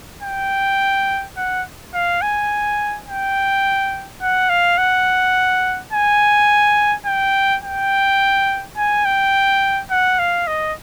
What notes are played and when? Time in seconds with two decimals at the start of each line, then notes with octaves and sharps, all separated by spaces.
0.23 G5
1.37 F#5
1.94 F5
2.22 G#5
3.08 G5
4.22 F#5
4.50 F5
4.78 F#5
5.93 G#5
7.06 G5
7.63 G5
8.77 G#5
9.05 G5
9.90 F#5
10.19 F5
10.47 D#5